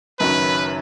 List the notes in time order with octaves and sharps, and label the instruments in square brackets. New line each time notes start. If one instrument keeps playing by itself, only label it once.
[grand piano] F#1 F#2 D#3 F#3 C#4 [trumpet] B4